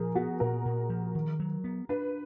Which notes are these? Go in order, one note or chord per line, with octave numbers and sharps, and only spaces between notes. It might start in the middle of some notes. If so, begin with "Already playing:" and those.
Already playing: A#2 F3 G#4 A#4
B3 F#4
A#2 A#4
A#2
F3
D#3
F#3
B3
D4 B4